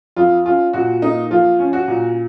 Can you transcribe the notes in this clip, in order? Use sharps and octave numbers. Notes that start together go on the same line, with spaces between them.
F2 F4
C#4 F4
A#2 F#4
A#3 D#4
F3 F4
C#4
F#4
A#2